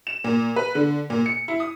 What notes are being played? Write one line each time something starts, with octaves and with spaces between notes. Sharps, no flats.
E7
A#2
B4
D3
A#2
C#7
E4
D#6